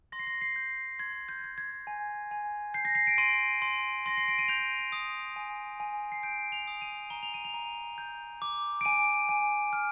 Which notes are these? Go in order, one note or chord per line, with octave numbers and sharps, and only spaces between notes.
C6 A#6
C7
A#6
C7
G6
C6 G#6
G6
G6
G#6
G#5
G#5
G6 C7
A#6
C7
D7
C6 D#7
C6
C6 A#6
C7
D7
D#7
G6 F7
D#6
G#5
G#5
C7
G6 D7
F7
D#6
D#7
A#5 G7
F7
D#7
F7
A#5
G6
D6
D7
G#5 D#7
G#5
F6